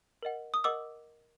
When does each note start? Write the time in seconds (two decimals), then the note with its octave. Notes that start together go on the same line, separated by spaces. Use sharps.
0.23 A#4 D#5 F#5
0.54 D#6
0.64 A#4 D#5 F#5 D6 E6